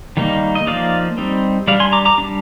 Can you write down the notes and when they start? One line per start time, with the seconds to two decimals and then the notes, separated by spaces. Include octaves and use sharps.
0.17 D#3 G3 A#3 D#4
0.55 D#5
0.67 F3 A#3 D#4 D5 F5
1.18 G3 C4 D#4
1.68 G3 D5 F5
1.72 D4
1.80 G#5 C6
1.92 A#5 D6
2.05 A#5 D6
2.18 G3 D4